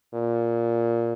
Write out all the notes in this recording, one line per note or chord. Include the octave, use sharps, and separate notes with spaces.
A#2